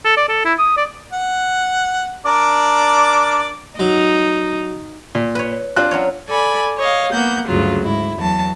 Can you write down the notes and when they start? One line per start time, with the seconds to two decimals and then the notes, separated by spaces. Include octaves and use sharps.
0.05 A4
0.17 D5
0.29 A4
0.45 E4
0.59 D#6
0.77 D5
1.12 F#5
2.26 D4 A#4 D5
3.79 F#3 D#4
5.15 A#2
5.35 B4 C#5
5.76 C4 D4 F4 F#6
5.91 F#3 C#4 C#5
6.27 A4 D5 G#5 B5
6.78 C#5 D#5 F5
7.12 A#3 B3 F#5 G6
7.47 D2 G2 C#3 F#3 F4
7.81 G#2 E4
8.18 E2 F#3 A5